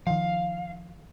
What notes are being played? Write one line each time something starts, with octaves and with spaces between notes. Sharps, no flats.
D#3 F3 F5